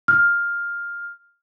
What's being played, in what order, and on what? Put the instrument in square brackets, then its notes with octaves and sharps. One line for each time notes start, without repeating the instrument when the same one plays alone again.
[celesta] F6